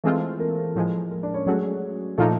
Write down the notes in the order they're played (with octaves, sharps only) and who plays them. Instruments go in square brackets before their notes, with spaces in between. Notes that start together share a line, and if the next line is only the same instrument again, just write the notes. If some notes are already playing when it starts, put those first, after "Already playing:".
[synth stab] E3 G#3 C4 F4 [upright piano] A3 A4
[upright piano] A#3 A#4
[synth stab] A2 F3 G#3
[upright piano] A#3 A#4
D4 D5
C#4 C#5
[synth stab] F#3 A3 C#4 F#4 [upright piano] G#3 G#4
[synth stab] A#2 F3 A#3 D#4 [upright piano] A3 A4